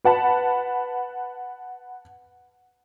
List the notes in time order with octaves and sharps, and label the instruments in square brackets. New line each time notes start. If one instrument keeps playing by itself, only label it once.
[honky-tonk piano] B4 F#5 A5 B5